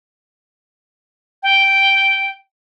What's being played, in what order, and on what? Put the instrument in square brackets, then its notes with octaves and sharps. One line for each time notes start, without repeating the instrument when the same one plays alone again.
[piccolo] G5